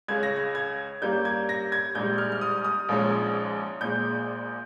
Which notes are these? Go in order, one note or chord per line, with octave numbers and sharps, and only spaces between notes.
C#2 C#3 G#3 C#4 G#6
A#6
G#6
G#6
G2 G3 A#3 C#4 G6
G#6
A#6
G#6
A#1 G#2 G3 G6
F6
F6
D#6
D#6
A#1 G#2 F3 G#3 C#4
A#1 A#2 G#3 G6